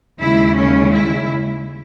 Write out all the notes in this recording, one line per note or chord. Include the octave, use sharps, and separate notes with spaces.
D#2 C#3 G#3 E4
C#4
E4